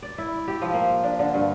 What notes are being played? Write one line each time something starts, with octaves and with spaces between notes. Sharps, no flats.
D5
E4
G4
F3
A#3
D4
D3
G2